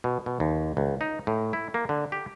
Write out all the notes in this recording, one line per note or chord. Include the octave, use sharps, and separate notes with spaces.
B2
B2
D#2
C#2
D#4
A2
E4
A#3
D3
G4